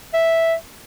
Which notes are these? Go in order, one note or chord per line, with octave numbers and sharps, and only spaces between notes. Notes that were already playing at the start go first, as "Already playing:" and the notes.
E5